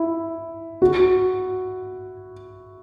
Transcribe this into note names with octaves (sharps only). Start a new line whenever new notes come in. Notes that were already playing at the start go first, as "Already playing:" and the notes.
Already playing: E4
F#4